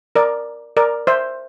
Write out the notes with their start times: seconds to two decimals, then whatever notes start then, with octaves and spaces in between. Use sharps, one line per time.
0.15 A#4 D5
0.77 A#4 D5
1.07 C5 E5